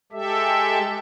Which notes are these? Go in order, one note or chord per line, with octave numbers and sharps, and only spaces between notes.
G#3 G4 A4 E5